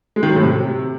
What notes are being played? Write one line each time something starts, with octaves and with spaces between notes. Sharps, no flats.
G#3
D#3
F#3
A2
C3